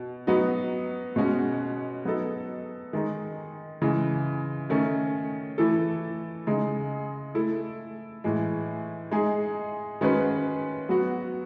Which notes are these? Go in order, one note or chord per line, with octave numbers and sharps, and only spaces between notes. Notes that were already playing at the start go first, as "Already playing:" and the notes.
Already playing: B2
F#3 B3 D#4 F#4
B2 G#3 C#4 F#4
F#3 B3 D#4 A4
D#3 G#3 D#4
C#3 E3 G#3
D#3 A3 C#4
E3 A3 E4 A4
C#3 G#3 D#4
A3 E4 A4
A2 E3 G#3
G#3 D#4 G#4
D#3 G#3 C#4 F#4 B4
F#3 B3 F#4